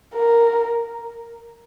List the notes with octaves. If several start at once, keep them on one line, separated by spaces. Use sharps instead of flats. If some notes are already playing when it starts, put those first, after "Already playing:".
A#4